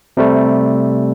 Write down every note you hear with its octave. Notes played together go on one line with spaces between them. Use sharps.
C3 G3 A3